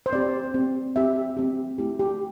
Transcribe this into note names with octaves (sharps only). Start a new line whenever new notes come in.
C5
C4 G4 D5
C4 G4
C4 G4 E5
C4 G4
A3 E4 G4
G4